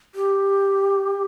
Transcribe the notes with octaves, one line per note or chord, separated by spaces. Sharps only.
G4